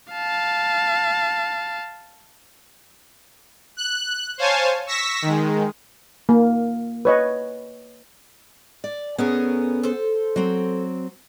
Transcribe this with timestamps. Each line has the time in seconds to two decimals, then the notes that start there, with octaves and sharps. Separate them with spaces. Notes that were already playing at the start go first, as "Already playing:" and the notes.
0.13 F5 A5
3.77 F#6
4.38 C5 C#5 F5 G#5 A5
4.86 C#6 E6 A#6 B6
5.22 D#3 G#3
6.29 A#3 A#4
7.05 B4 C#5 D#5
8.84 D5
9.18 A2 B3 C#4 G#4 A#4 G#5
9.83 A4 C5
10.36 F#3 C4